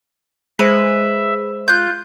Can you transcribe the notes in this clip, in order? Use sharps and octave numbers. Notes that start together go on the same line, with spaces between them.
G#3 G#4 B4 C5 E5
F4 F#6 G6